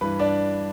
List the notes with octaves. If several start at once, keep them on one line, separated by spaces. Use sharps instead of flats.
G2 E3 B4 B5
D4 D5